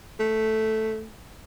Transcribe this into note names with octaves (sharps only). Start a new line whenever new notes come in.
A3